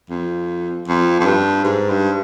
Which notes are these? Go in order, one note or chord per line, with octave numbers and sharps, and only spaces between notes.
F2
F2
F2
G2
G#2
G2